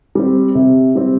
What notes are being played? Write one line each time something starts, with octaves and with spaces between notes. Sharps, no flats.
G3 C4
C3
G3 C4